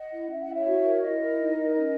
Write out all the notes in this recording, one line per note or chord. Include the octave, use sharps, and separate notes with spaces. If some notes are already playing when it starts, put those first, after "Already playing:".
Already playing: D#5 F#5
E4
C#4 E5
E4 F#5
C#5 E5
F#4
A#4
E4 D#5
A#4
D#4
A#4
C#4 D#5